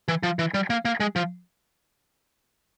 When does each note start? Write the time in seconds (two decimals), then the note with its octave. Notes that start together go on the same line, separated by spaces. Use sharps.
0.08 E3
0.23 F3
0.39 E3
0.54 G3
0.70 A#3
0.85 A#3
1.00 G#3
1.16 F3